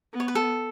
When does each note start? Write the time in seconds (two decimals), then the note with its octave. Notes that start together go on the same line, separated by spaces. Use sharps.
0.13 B3
0.20 C#5
0.28 B4
0.35 A4